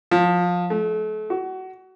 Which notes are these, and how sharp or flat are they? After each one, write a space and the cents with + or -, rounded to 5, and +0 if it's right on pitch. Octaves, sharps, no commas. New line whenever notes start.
F3 +20
A3 -35
F#4 +25